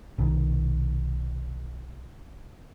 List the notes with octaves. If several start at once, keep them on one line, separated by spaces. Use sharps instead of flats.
B1 C3 D#3